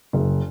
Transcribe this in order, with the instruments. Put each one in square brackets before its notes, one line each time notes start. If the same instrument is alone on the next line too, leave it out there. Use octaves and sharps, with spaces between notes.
[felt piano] F#1